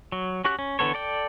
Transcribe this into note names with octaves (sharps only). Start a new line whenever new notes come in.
F#3
C#4 F#4 G4 F#6
C#4
D3 E3 B3 A4 C#5
A4 D5 G5